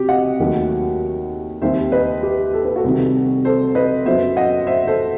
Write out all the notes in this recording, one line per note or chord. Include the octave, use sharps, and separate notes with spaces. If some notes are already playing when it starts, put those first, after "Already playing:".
Already playing: C3 F#3 G4
D#5 F#5
D#2 D#3 F#3 A3
D#2 D#3 G3 C4 C5 E5
B4 D#5
G4
A4
B4
F#4 A4
C2 C3 D#3
A4 C5
B4 D#5
F#2 F#3 B3 C5 E5
D#5 F#5
C5 E5
A4 C5